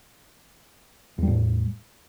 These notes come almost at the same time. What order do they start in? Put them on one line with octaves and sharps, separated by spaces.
E2 G3 A2